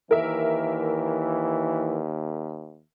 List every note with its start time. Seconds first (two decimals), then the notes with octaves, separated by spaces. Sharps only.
0.11 D#2 E3 A#4 E5